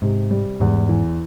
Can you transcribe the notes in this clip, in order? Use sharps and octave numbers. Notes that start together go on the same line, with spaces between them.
G#2 C3
G3
E2 G#2
E3